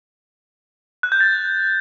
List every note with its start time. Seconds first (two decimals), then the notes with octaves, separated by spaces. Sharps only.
1.03 F#6
1.12 G6
1.20 A6